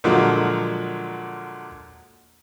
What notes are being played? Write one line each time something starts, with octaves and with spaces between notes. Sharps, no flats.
A#2 D3 F3 F#3 G#3 A#3